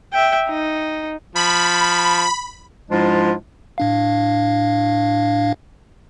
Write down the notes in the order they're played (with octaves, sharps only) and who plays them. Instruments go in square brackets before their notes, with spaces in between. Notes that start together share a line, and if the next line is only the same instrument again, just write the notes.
[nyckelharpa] E5 G5
D#4
[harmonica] F3 [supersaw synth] B5
[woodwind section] G#2 F3 G#3 D4 E4 F4
[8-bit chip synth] A2 D4 F5